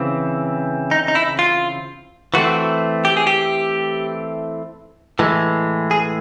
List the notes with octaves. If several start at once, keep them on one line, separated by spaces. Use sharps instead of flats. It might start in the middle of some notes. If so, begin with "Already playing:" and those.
Already playing: C#3 E3 C4
D#4
D#4
E4
F4
E3 A3 C4 F#4
G4
G#4
G4
A2 E3 G#3
G#4